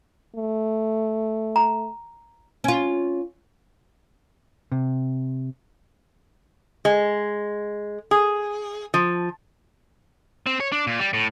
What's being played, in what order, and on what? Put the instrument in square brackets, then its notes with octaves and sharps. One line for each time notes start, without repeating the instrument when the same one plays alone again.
[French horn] A3
[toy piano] A#5
[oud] C#4 F4
[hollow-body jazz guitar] C3
[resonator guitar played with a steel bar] G#3
G#4
F3
[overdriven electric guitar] C4
C#5
D4
A#2
G3
A2